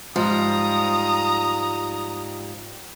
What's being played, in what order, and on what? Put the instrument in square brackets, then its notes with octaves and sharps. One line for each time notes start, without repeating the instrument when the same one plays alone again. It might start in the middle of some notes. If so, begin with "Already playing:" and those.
[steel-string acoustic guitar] G#2 F3 G3 [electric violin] A#5 D#6